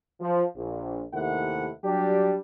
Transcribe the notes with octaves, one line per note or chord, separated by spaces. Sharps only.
F3
A#1
D#2 C3 D#3 A3 E4 F#5
F#3 G3 D4 G4